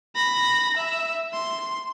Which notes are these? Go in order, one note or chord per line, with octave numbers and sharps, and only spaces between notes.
B5 A#6
E5
C6